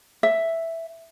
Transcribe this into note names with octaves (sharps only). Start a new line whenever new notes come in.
E5